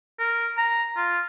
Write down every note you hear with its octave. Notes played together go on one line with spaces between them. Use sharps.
A#4
A#5
F4